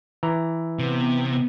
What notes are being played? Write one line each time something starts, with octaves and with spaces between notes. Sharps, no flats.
E3 A#5
C3 B3